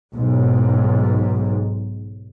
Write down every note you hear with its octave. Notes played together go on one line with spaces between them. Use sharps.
B1 G#2